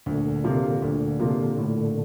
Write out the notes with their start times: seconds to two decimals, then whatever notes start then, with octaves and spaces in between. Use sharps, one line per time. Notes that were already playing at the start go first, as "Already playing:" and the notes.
0.06 D2 A#2 D3
0.44 C3 F3 A#3 F4
0.82 D2
1.20 C3 F3 A#3 F4
1.58 A2